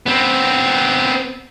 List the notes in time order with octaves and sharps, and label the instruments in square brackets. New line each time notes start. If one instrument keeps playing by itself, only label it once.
[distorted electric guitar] B3 C4